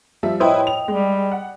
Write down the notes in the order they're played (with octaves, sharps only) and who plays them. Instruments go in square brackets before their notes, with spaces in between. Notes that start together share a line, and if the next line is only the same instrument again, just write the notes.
[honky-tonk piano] F3 G3 E5
[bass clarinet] A2 [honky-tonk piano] E4 B4 C5 [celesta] D#5 G5 D#6
[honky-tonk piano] F7
[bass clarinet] G3 [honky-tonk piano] G#3
[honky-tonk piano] F#5